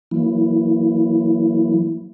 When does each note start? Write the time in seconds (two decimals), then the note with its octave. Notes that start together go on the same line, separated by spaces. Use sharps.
0.11 E3 F#3 A#3 E4